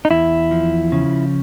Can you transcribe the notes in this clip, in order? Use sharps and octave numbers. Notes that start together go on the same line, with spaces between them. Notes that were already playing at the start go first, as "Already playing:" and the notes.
D#4
E2 E4
F3
C#3